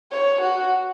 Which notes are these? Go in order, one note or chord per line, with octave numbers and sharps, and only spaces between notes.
C#5
F#4